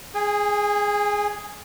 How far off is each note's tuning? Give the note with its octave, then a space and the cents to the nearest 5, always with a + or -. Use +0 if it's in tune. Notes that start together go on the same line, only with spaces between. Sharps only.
G#4 +0 G#5 -35